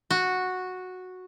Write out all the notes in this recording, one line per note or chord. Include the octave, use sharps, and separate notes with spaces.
F#4